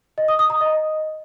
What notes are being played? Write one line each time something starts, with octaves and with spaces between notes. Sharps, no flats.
D#5
D#6
D#6
A#5
D#5